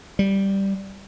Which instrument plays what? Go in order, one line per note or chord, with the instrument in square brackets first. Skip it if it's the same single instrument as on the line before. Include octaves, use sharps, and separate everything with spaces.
[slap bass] G3